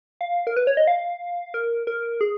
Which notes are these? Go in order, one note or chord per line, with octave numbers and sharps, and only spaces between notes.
F5
A#4
B4
C#5
D#5
F5
A#4
A#4
G#4